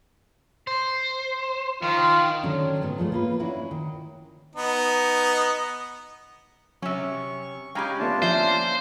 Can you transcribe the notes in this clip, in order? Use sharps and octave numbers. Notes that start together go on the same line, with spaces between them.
C5
D#3 F4
D3 D#3 F#3 C#4 D4
G#2 F#3 B3
F3 G#3 A3 B3
A#3 F4 B4
C#4 D4 E4 F#4
D#3
B3 D#4
C3 F#3 C#4 E5 C#6
G#3 C#4 G4 F5 G5 G#5 A#5 B5
D3 A3 B3 D4 F4 A5
F3 A#3 C#4 C5 E5 E6